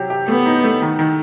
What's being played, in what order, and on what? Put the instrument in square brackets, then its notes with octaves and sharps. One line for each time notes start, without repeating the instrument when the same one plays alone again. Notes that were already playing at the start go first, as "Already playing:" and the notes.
Already playing: [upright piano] C3 F#3 G4
G4
[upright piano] A3 [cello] B3
[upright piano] D#4
A3
D#3
D#3